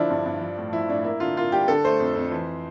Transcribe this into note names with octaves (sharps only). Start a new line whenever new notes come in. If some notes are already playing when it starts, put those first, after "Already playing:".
Already playing: D3 F3 D4 E4
G2
G2
F3
A2
F3 E4
A2 D4
A#3 E4
D3 F4
A#3 F4
G3 G4
D3 A4
A3 C5
F2
F2
E3